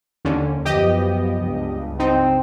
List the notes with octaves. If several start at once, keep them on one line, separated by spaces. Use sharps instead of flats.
D#2 D3 C#4
F#2 F3 B3 G4 D#5
C#2 G2
C4 D#4